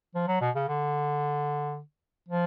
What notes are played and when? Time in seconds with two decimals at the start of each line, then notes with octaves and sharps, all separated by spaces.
0.15 F3
0.28 F#3
0.41 B2
0.55 C#3
0.68 D3
2.28 F3